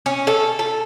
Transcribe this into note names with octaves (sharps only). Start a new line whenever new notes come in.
C#4
A4
A4